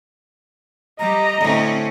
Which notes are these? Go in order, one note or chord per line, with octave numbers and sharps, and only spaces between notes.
G3 G4 D#5 A#5
A2 D3 C4 C#4